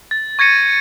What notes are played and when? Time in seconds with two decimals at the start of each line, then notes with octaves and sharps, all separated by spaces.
0.11 A6
0.39 C#6 G#6 A#6 C#7 D#7